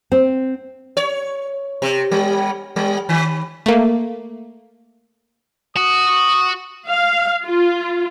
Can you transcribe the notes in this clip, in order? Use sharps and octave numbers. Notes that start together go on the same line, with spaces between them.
C4
C#5
C3
G3
G3
D#3
A3 A#3
F#4 D#6
F5
F4